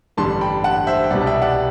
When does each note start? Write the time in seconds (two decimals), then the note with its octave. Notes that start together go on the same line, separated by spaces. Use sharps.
0.17 A1 G2 D3 G3 A5 C6
0.41 G5 B5
0.64 F#5 A5
0.87 C5 E5
1.04 G5
1.10 C2 B2 G3 D5 F#5
1.21 A5
1.26 E5 G5
1.42 D5 F#5